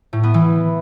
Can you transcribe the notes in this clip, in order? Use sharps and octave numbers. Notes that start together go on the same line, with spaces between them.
A2
B3
E3